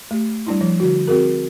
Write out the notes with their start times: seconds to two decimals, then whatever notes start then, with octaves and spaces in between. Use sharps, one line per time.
0.11 A3 G4
0.47 G3 D4 E4
0.61 F3
0.80 D3 F#4
1.08 C4 F#4 G#4 A#4